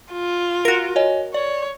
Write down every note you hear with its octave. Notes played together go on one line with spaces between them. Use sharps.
F4
F#4 A#4
C#5 D#5 G#5
C#5 D5